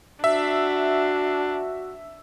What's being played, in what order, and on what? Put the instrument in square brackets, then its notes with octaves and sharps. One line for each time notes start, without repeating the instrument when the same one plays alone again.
[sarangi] D4 [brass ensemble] F#4 [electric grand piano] E5